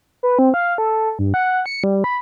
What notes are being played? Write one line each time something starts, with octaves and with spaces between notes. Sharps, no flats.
B4
C4
F5
A4
G2
F#5
C#7
G3
B5